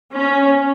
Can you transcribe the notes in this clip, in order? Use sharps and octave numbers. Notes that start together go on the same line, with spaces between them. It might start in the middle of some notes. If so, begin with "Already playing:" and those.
C#4